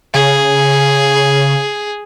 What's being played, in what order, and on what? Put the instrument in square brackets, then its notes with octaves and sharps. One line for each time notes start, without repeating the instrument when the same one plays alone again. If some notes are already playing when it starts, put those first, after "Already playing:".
[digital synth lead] C#3 [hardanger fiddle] G#4